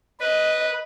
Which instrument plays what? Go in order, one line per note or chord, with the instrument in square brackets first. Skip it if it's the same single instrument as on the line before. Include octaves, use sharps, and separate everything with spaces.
[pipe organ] B4 [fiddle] D#5